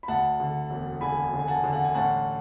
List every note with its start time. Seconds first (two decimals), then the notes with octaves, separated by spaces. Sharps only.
0.03 B5
0.08 D2 F#5 A5
0.40 D3
0.70 E1
1.01 D3 G#5 B5
1.33 D3
1.39 G#5
1.48 F#5 A5
1.64 D3
1.72 F#5
1.84 G#5
1.95 A1 F#5 A5